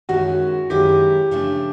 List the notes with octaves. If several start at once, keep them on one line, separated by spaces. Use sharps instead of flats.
F#2 D#3 G#3 C#4 E4 F#4
F#2 D#3 G#3 C#4 E4 G4
C#3 F3 A3 D4